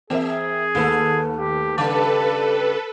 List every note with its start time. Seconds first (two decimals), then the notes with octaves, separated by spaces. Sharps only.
0.10 E3 C4 G#4 A#4 E5
0.75 D#2 A3 A#3 A4 B4
1.37 G4
1.78 G2 C#3 G3 A4 B4 A5 D6